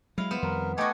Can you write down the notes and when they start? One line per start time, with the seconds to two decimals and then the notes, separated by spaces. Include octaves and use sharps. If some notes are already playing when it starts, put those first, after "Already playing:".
0.18 F#3 G#3 E4 F5
0.31 B3 C5
0.43 F2 D#3 G3 A#4
0.78 A3 B3 F#4 D#5 G5 G#5 D6